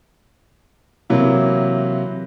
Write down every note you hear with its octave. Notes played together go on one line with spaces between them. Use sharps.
C3 E3 F#3 A#3 E4